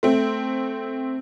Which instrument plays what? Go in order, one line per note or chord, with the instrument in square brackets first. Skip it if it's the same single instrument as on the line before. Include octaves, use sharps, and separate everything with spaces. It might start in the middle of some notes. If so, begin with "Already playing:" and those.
[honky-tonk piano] A3 C4